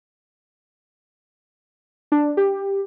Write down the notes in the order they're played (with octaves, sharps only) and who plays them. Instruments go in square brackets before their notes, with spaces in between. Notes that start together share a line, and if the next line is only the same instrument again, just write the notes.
[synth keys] D4
G4